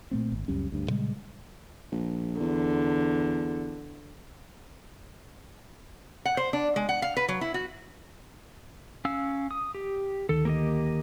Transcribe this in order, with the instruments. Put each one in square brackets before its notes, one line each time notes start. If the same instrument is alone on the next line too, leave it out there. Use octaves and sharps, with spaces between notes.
[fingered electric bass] A#2 A3 C4
G#1
C#2 F#2 G3 C#4
D2 G2
A#2 C#3 G3 G#3
[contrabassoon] A#1
[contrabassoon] E2 [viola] D3
[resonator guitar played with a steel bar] F#5
C5
D4
G#3
F#5
F5
B4
F#3
E4
F#4
[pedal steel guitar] C#4 F5 E6
D#6
G4
[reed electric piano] D2 D#3 [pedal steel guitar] A4
[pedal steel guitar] A#3 G4 D#5